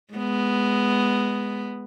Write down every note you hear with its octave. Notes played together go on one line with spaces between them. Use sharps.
G#3 B3